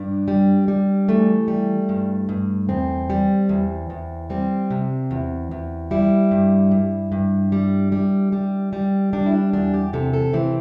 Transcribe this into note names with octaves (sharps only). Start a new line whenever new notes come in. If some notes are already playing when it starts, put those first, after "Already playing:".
Already playing: G2 D4
G3
G3
E3 A3
G3
G2
G2
E2 C4
G3
E2
E2
G3 C4
C3
E2
E2
G3 E4
G2
G2
G2
G3
G3
G3
G3
G3 D4
E4
D4
E2 D4
G4
C3 A4
A4
E3 C4